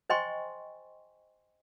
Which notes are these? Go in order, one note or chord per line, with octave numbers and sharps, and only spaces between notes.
C5 D#5 G5 G#5 C6 C#6